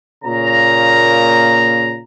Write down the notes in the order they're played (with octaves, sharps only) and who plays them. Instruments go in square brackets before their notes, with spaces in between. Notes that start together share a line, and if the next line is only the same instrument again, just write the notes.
[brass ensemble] A#2 C#3 A#3 A#5